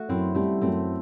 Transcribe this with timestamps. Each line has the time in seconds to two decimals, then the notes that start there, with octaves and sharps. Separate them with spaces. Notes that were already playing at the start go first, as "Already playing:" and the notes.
Already playing: A3 F#4
0.09 F#2 C4 E4
0.35 G3 A3 C4
0.61 F#2 A3 C4